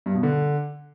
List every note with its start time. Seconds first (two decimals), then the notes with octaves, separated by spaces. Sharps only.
0.06 G2
0.15 B2
0.23 D3